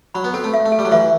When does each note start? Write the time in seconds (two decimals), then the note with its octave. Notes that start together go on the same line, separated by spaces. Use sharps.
0.14 F#3 B5
0.24 B3
0.34 C4 A4
0.44 A3
0.54 E5
0.66 A3
0.72 A4
0.79 G3
0.85 F#3
0.92 E3 E5